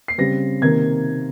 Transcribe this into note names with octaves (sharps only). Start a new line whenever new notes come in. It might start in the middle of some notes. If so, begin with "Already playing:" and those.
C7
C#3 G3 C4 A#6
C3 D#3 A#3 G#6